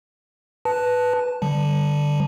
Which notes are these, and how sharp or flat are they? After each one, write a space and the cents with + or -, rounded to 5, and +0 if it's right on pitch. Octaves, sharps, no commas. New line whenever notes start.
B4 +0 A5 +0
D3 +0 G3 +0 A5 +0